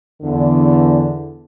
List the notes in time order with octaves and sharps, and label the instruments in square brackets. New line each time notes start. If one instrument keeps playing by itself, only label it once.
[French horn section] E2 D3